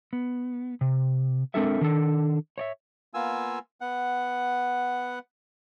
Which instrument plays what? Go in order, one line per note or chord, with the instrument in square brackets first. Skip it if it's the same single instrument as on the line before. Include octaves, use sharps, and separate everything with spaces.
[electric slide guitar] B3
C3
G#3 C4 D4 A4 A#4 E5
D#3 D4 A4
C#5 D5 E5
[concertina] A#3 B3 F4 G#5 E6
B3 F#5